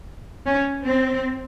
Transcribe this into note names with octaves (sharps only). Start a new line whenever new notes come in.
C#4
C4